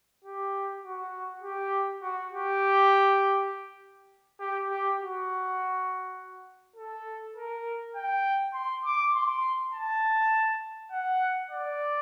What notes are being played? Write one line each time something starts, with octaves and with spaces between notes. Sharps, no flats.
G4
F#4
G4
F#4
G4
G4
G4
F#4
A4
A#4
G5
C6
D6
C6
A5
F#5
D5